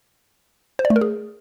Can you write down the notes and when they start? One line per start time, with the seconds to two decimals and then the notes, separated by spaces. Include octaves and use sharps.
0.79 C5
0.85 D5
0.90 A3
0.96 A#4
1.01 G#4